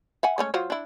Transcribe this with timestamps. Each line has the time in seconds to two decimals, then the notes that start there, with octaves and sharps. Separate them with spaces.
0.23 E5 F#5 G#5
0.38 G#3 A3 C#4
0.54 F#3 F4 C5
0.70 D4 E4